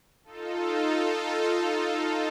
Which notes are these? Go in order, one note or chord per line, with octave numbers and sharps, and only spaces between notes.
D#4 F4 A4